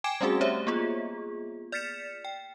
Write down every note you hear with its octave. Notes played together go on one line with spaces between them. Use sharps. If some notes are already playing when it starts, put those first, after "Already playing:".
G5 G#5 D6 G#6 D7 E7
G3 A3 C4 C#4 F#4 G#4
A3 G4 C5 C#5 E5
A#3 B3 F4 G#4
D5 F6 A6 B6 C#7 E7
G5